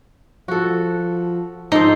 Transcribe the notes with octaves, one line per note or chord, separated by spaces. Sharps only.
F3 F#4 A4
G#2 F3 D#4 A4 C5